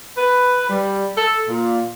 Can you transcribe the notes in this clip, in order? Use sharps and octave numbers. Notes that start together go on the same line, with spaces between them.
B4
G3
A4
A#2